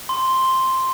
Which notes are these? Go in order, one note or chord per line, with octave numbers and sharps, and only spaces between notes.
C6